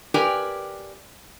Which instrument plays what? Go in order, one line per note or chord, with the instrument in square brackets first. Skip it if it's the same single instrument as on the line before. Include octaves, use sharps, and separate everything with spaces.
[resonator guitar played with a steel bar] G4 A#4 B4 D5 G5 G#5